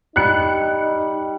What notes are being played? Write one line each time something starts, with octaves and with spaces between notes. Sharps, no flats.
G3 D#4 F#6 C#7